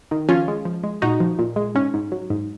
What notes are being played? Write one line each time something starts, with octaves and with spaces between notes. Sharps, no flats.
D#3
F3 C#4 F4
G#3
F3
G#3
A#2 D#4 F#4
F3
A#2
G#3
G#2 C#4
G#2
F#3
G#2